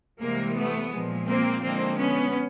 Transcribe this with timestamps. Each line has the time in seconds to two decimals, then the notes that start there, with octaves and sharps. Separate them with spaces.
0.20 C3 E3 G3 G#3 A#3
0.55 A3 B3
0.91 A#2 F3 G#3
1.26 A#3 C4
1.61 D3 F3 G#3 A#3 C4
1.96 B3 C#4